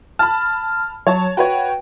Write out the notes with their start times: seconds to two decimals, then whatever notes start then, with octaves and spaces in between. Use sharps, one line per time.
0.19 A5 B5 F6
1.07 F#3 C#5 A5
1.37 F#4 B4 C#5 G5